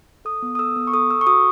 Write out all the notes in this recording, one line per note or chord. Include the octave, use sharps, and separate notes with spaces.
A4 D#6
B3
D#6
A4 E6
B3
C#6
A4 D#6
A4 E6
C#6
F#4 D#6